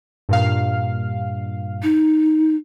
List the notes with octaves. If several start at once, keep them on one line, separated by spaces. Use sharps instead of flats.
G2 A#2 F5
D#4